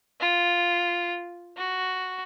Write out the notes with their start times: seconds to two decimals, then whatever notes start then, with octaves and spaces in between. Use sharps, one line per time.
0.20 F4
1.57 F#4